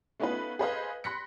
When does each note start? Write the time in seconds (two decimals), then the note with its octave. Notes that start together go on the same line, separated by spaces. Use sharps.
0.20 A3 B3 C#4 D#4 F4 B4
0.59 G#4 A4 B4 C5 D#5 F5
1.04 B5 C6 F#6 A#6 B6 C#7